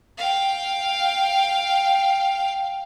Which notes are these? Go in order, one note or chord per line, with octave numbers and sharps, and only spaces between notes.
F5 G5